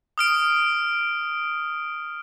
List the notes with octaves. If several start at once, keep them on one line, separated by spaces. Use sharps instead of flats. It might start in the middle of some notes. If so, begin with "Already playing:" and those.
D#6 F6 D7